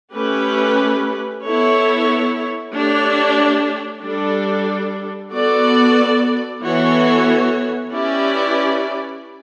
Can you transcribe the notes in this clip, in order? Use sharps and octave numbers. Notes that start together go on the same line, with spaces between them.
A3 C#4 G4 B4
B3 E4 A4 C#5
A3 D4 G4 C#5
G3 D4 A4
B3 F#4 A4 D5
E3 B3 F#4 A4 C#5
C#4 E4 G4 B4 D5